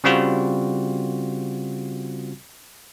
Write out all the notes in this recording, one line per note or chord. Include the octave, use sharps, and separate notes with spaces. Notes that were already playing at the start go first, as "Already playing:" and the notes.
C#3 G3 C4 F4 F#4